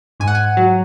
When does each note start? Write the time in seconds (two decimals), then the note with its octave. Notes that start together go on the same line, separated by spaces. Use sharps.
0.20 G#2 G#5
0.28 F#5
0.35 G#5
0.57 F#3